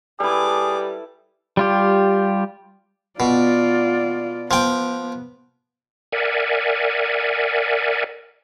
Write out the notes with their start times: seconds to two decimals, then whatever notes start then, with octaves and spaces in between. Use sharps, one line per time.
0.20 G3 E4 G#4 A4 B4 D6
1.57 G3 F4 G4
3.20 B2 F4 D5
4.51 F3 B3 G5
6.12 A#4 D5 E5 F#5 G#5